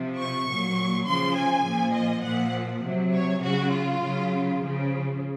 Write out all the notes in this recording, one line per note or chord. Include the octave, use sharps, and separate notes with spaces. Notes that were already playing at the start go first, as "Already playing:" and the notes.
Already playing: C3 F3
C#6
A#2 F#3
C#3 F3 C6
G#5
A#2 F3
D#5
A#2 F3 F#5
C3 F#3
C#5
C#3 F#3 F#4
F4
C#3 F#3
C#3 F3